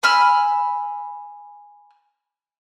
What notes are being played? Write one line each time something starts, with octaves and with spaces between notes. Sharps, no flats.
G#5 B5 E6 F6